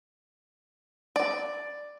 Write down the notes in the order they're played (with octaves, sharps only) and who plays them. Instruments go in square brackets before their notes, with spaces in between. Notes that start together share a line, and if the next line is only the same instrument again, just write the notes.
[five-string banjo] D5